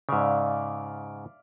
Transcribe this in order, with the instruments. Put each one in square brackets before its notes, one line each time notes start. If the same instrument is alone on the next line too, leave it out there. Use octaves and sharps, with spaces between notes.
[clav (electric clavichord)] G#2 C#3 [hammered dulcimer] D5 E5 F5